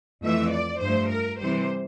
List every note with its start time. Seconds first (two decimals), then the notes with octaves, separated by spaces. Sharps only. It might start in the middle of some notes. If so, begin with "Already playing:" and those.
0.23 F2 E3 A3 E5
0.53 D5
0.82 G2 F3 A3 C5
1.11 A#4
1.40 C3 E3 G3 C5